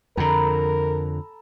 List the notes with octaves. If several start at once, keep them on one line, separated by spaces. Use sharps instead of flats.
F2 D3 A4 A#4 A#5 B5